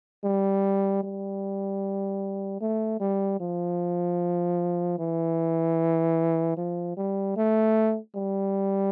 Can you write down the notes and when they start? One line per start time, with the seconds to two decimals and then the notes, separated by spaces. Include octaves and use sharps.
0.24 G3
1.03 G3
2.61 A3
3.00 G3
3.40 F3
4.99 E3
6.57 F3
6.97 G3
7.37 A3
8.15 G3